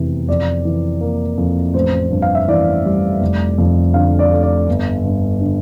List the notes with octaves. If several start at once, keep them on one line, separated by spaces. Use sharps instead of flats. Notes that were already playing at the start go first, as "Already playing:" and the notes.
Already playing: F1 E2 C3 E3
F2 D5
E3
A#3
F2
A1 C5
G2
F5
E5
E3 D5
G3
F1
F2
D3 F5
D5
A3
D5
G1
G2
D3